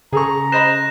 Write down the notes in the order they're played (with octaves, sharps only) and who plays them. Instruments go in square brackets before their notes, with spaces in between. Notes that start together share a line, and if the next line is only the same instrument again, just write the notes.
[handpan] C#3 [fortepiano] G#4 A4 C#6 [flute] A#5
[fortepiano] C5 D#5 B5 [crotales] F#6 A#6 E7